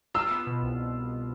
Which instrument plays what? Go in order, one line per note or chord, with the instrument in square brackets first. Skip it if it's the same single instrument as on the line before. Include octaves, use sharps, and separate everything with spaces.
[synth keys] F4 [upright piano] E6
[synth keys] B3
B2
C2